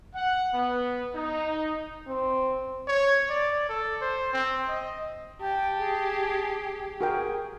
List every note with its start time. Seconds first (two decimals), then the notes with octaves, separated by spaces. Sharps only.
0.15 F#5
0.54 B3
1.16 D#4
2.07 C4
2.87 C#5
3.30 D5
3.69 A4
4.01 C5
4.33 C4
4.68 D#5
5.41 G4 G5 A5
5.79 G#4
7.01 F#4 G#4 A#4 G5